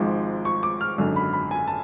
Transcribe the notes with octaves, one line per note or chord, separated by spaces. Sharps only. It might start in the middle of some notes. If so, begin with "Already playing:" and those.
Already playing: G#1 G#2 F3
C#6
D6
F6
G#1 F#2 D3
B5
B5
G#5
A5